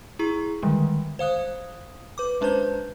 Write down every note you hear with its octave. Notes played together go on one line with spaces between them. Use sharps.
E4 G#4 A#5 C#6
D3 D#3 G3 G#3
C5 F5 D#6 F#6
B4 D6
G#3 C#4 D4 B4 C5 G6